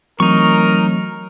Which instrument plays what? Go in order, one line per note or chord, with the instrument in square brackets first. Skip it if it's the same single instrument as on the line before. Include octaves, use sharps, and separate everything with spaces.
[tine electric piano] E3 A3 C4 [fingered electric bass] F#3 [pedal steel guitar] D#4 C#6 [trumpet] A#4